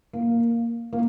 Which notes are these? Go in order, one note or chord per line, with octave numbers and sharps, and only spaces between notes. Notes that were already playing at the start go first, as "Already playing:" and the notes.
A#3
A#3